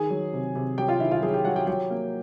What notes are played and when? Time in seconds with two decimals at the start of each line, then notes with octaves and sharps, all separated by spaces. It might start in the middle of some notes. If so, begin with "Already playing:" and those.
Already playing: D#3 G#4 G#5
0.10 F#3
0.33 C3
0.55 C3
0.78 F#3 G4 G5
0.88 F4 F5
1.00 D#3 E4 E5
1.11 F4 F5
1.23 F#3 G#4 G#5
1.34 G4 G5
1.45 F#3 F#4 F#5
1.56 G4 G5
1.67 F#3 G4 G5
1.90 A#3